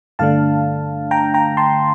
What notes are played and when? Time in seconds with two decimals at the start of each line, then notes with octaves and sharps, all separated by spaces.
0.19 G2 D3 A3 D4 F5 A5
1.11 G5 A#5
1.34 G5 A#5
1.57 A5 C6